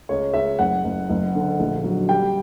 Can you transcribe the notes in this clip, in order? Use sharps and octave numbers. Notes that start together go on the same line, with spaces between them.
C#2 C#5
C#2 E5
F#1 F#5
F#1
F#1
D3
A#1
F#3
G3 G5